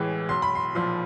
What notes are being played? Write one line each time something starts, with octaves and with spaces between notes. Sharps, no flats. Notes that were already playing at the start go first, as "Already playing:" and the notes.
Already playing: A1 A2 E3 G#3
B1 C6
B5
C6
A#2 F3 C6